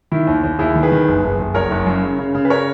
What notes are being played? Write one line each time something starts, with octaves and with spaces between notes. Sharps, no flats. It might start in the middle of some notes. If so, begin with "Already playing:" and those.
D#3 E4
D#2
D#2
D#2 E4 G#4
D#3
G#4 B4
D#3
F#1
F#1
F#1
F#1 A#4 C#5
F#1
F#2
C#3
C#3
C#3
B4
A#4 C#5